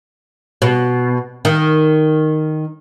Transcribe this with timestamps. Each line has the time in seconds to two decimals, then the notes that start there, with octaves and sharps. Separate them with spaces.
0.62 B2
1.45 D#3